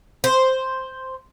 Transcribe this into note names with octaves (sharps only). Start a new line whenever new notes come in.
C5